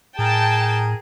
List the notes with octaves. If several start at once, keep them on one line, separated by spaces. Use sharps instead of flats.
A2 G#4 A#4 G5 A5